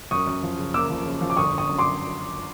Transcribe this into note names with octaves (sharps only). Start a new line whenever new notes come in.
F#2 C#6 D#6
F#2
F3
C#3
A#3 D6 E6
F3
C#3
F3
D6
G1 C#6 D#6
G1
C#6 D#6
F#2
C6 D6